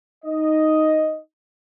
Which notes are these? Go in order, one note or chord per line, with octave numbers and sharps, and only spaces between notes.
D#4 D#5